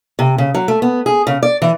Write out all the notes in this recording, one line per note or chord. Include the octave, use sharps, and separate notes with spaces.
C3
C#3
F#3
A3
B3
G#4
C#3
D5
E3